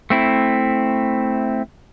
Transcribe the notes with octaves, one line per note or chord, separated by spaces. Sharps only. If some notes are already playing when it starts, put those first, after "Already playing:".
A3 C4 E4